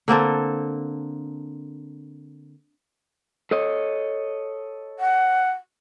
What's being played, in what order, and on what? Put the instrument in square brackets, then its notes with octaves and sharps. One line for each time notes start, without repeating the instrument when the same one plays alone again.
[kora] D3 A#3 C4 A4
[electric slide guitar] A4 C#5 D#5
[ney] F#5